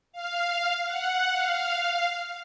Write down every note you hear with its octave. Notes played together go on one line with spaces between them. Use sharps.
F5
F#5
F5